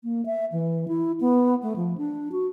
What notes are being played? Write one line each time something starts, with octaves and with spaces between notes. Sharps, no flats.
A#3
E5
E3
E4
B3
A3
F3
D4
F#4